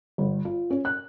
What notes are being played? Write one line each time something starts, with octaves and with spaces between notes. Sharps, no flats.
G1
F4
C#4
F#6